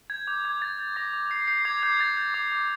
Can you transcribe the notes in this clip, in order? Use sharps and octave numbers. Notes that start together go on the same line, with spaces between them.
G6 G#6
D6 G6
D6 G#6
G6 A6
G6
D6 A#6
D6
G6 C7
G6 C7
D6 G#6
D6 G6
G6 A6
G6
D6
D6